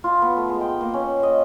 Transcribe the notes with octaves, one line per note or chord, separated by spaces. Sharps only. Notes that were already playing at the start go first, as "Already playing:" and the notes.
F4
B3
A3
G#3
G5
A#3
C#4
D#5